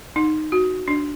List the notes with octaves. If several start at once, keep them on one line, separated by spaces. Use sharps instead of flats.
D#4
F#4
D4